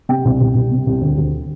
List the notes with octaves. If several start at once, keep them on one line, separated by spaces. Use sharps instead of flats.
C3 G5
C2
C2
C2
C3
C2
D2
D2